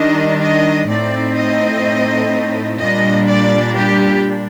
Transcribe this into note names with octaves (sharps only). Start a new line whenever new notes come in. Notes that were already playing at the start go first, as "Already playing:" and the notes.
Already playing: D#3 G3 D4 D#5
D#5
A2 A3 C4 D#4 D5
D#5
A#2 G3 D4 D#5
D5
G4